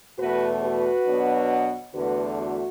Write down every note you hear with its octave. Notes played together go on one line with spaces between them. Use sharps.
E2 B2 A3 F#4 B4
F#4 B4
B2 F#3 B3 D4
E2 D3 A3 F#4 B4
F#4